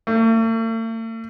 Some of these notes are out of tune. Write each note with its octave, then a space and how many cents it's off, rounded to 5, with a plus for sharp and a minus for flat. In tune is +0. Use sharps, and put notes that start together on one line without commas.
A3 +45